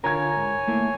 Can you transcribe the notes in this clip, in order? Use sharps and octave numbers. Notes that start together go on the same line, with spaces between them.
D3 F4 A#4 C#5 G#5 A#5 G#6
G#2
A3 A#3 E4